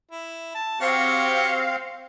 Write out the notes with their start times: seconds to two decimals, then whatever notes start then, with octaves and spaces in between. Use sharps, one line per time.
0.11 E4
0.55 A5
0.81 C4 F#4 G4 C#5 F5